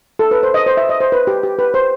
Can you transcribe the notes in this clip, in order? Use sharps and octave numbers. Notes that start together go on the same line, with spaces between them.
A4
B4
C5
D#5
C5
E5
D#5
C5
B4
G4
G4
B4
C5